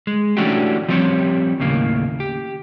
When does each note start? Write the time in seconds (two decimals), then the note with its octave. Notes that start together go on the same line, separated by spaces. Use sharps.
0.07 G#3
0.37 E3 A3 C#4 D4 F#4 G4
0.88 F3 G3 C4 G4 C#5
1.60 D#2 A2 C#3 A#3
2.20 G4